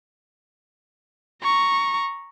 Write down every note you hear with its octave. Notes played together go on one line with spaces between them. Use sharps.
A#5 C#6